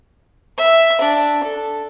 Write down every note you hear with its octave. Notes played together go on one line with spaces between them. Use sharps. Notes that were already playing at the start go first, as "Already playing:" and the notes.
E5
D4
A4